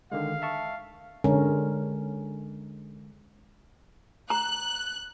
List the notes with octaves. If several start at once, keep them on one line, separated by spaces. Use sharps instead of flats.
D3 D#3 G#3 F5
E5 A5 C#6
D3 G#3 C#4 A#4
A#5 F#6